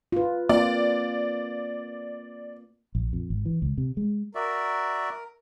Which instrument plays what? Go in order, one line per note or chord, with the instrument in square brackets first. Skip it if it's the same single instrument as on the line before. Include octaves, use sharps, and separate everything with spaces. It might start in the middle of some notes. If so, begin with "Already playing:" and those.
[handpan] F4 B4
[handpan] A#3 C4 F4 [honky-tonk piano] D5
[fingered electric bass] A#1
F2
G#1
E3
C#2
C3
G#3
[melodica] F#4 D5 E5 [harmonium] A#4